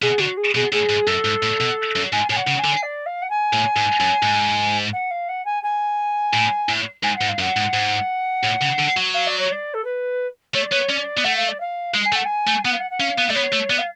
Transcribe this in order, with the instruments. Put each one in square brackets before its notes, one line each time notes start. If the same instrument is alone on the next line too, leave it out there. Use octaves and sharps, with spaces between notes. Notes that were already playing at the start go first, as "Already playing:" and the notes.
[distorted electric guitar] B2 [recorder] G#4
[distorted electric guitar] D3 [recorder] F#4
[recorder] G#4
[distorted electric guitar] B2 [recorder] G#4
[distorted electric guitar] A2 [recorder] G#4
[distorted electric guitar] G#2
[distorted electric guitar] F#2 [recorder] A4
[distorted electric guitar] G#2
A2
B2
F#2
[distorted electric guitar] G#2 [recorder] G#5
[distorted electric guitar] A2 [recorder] G#5
[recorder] F#5
[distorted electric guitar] C#3
[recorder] G#5
[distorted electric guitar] D3
[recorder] D5
F5
F#5
G#5
[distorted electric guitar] A2
G#2
F#2
G#2
[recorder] F#5
F5
F#5
G#5
G#5
[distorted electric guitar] A2
A2
[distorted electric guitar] G#2 [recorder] G#5
[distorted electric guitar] G#2 [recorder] F#5
[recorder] F5
[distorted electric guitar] F#2 [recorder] F#5
[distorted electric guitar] G#2
G#2
A2
C#3
D3
F#3
[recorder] F5
D5
C#5
D5
A4
B4
[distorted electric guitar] A3 [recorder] C#5
[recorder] D5
[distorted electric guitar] B3 [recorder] C#5
[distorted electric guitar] C#4 [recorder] D5
[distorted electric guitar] B3
[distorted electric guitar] A3 [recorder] F#5
[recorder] F5
D5
F5
[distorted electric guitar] G#3
[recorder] G#5
[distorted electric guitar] A3
[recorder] F#5
G#5
[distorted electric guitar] A3
[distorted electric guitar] B3 [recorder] F#5
[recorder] F5
F#5
F#5
[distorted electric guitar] C#4 [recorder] F5
[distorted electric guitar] B3
[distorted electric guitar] A3 [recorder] D5
[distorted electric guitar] B3 [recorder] C#5
[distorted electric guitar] A3
[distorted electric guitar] B3 [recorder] D5
[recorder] F5